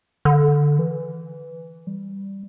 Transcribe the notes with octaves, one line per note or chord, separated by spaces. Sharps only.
D3
E3
G3